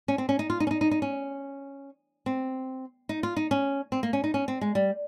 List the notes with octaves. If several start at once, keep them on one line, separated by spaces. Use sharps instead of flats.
C#4
C4
C#4
D#4
F4
D#4
C#4
D#4
D#4
D#4
C#4
C4
D#4
F4
D#4
C#4
C4
A#3
C#4
D#4
C#4
C4
G#3
G3